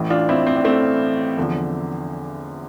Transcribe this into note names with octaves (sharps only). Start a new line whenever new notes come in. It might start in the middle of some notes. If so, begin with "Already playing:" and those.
Already playing: A1 A2 E3
D4 F4
C4 E4
C4
D4
A3 C4
E2 D3 F3